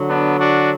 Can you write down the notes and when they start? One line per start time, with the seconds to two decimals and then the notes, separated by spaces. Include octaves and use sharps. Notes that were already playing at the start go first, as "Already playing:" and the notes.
Already playing: D3 F#3
0.09 B3 D4
0.40 D4 F#4